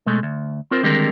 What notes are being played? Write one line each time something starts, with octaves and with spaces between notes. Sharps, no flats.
B2 G#3 A3
D2
C4 F4 A#4 C5
D3 D#3 G3 G#3 C4 A#4